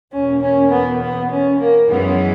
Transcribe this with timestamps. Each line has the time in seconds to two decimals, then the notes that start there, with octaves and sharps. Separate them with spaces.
0.12 E2 B2 A#3 C#4
0.41 C#4
0.70 B3
1.01 B3
1.30 C#4
1.59 A#3
1.89 F#2 E3 G#3 B3 C#4